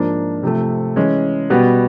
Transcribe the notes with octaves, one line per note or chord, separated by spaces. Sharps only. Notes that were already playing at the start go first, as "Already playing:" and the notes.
Already playing: G#2 F3 A#3 D4
C3 F3 A3
E3 G#3 C#4
B2 G3 B3